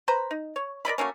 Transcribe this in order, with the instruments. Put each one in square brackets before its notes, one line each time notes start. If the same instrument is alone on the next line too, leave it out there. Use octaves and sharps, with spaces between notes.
[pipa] B4 C5 A#5 B5
D#4
C#5
A#4 D5 D#5 B5
F#3 A3 A#3 C#4